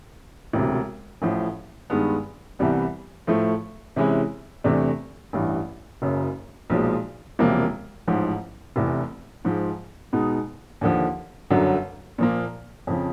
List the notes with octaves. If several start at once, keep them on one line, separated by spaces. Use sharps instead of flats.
E1 D2 C3
A1 A2 F3
G2 D#3 G#3 B3
C2 C3 E3 G3 B3
A2 F3 A3
C3 E3 G#3 C#4 E4
E2 C3 E3 A3 D4
A1 G2 E3
F#1 F#2 C#3
B1 A#2 F3 G#3
E1 E2 C3 F3 A#3
A1 G#2 F3
F1 E2 C3 E3
G#2 F3 G#3
B2 G#3 B3 D#4
D#2 D3 F3
G1 F#2 D3 F#3
A#2 F3 A#3
F2 C#3 F3